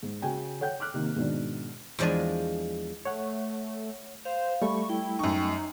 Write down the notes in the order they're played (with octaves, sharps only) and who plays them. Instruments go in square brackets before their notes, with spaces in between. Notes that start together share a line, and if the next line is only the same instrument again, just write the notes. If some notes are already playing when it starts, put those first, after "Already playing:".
[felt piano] G#2
C#3 F#4 G5 G#5
A4 C#5 F#5 G5 G6
D6 F6 F#6
C3 D#3 A#3
G#2 B2 D#3 D4
[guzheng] E2 F3 G#3 D4 D5 G#5
[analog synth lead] A3 [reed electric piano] C#5 F#5
[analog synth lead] C5 [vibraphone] F5
[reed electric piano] G3 A3 [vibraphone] B5 [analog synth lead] C#6
[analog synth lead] E4 [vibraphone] G5
[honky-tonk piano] F#2 C#6 [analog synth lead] D#4